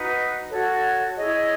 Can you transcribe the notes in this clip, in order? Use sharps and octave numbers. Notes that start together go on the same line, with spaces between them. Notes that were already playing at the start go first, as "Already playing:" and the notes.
Already playing: D#4 F#4 B4
F#4 A4 C#5
E4 G#4 C#5 D#5